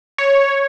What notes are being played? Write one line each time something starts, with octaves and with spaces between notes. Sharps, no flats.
C#5